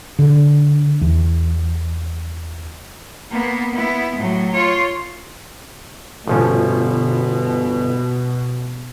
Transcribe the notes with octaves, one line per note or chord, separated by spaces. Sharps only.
D3
E2
A#3 B3
B3 E4
A2 F#3
F4 C#5
G1 B2 F3 C#4